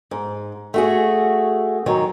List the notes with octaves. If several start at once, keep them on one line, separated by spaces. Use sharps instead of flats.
G#2
A3 F#4 G#4
D#3 F#3 G#3 C#5